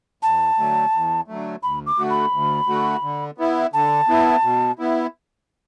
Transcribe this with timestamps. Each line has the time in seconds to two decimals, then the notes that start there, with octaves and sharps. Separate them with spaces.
0.23 E2 A5
0.58 D3 F#3 A3
0.93 E2
1.28 D3 F#3 A3
1.63 D2 B5
1.86 D6
1.98 D3 A3 F#4
2.10 B5
2.33 D2
2.68 D3 A3 F#4
3.03 D3
3.38 B3 E4
3.73 D3 A5
4.08 B3 E4
4.44 B2
4.79 B3 E4